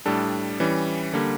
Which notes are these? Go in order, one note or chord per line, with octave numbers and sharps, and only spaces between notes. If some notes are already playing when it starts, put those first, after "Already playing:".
A2 G3 D4 A4
E3 G3 C#4
D3 G3 A#3